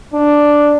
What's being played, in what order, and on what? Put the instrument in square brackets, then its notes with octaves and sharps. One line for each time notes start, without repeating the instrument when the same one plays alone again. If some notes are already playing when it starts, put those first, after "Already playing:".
[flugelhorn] D4